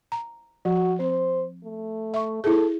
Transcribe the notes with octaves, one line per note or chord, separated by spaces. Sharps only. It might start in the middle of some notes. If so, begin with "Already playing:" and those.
A#5
F3 F#4
C4 C5
A3
E5 C#6
E4 G#4 A4